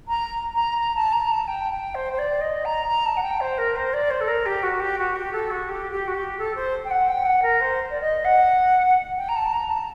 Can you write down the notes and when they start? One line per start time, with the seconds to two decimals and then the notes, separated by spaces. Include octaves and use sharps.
0.08 A#5
0.54 A#5
0.78 A#5
0.95 A5
1.12 A#5
1.31 A5
1.48 G5
1.71 G5
1.95 C5
2.13 C5
2.18 D5
2.41 D#5
2.65 A#5
2.87 A#5
3.05 A5
3.17 F#5
3.22 G5
3.40 C5
3.58 A#4
3.76 C5
3.93 D5
4.10 C5
4.21 A4
4.28 A#4
4.46 G4
4.63 F#4
4.80 G4
4.98 F#4
5.16 G4
5.32 A4
5.51 F#4
5.69 G4
5.92 G4
6.08 F#4
6.14 G4
6.38 A4
6.55 C5
6.85 G5
6.90 F#5
7.08 G5
7.25 F#5
7.42 A#4
7.61 C5
7.90 D5
8.01 D#5
8.24 F#5
9.18 G5
9.29 A#5
9.36 A5
9.53 A#5
9.70 A5